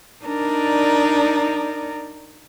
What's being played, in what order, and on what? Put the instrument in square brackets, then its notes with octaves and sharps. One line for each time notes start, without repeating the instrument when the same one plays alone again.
[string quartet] D4 D#4 A#4 D5